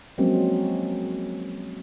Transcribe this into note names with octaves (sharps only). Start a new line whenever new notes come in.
F3 F#3 G#3 A#3 C4 C#4